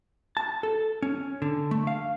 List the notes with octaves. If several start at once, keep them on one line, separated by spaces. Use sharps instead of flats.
A5
A4
C#4
D3
A3
F5